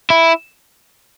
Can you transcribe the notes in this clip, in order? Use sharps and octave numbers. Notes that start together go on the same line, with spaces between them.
E4